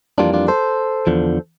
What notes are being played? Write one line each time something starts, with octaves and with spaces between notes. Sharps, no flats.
F2 E3 G3 A#3 D4 F4
D4 F4
A4 C5
E2 D3 F3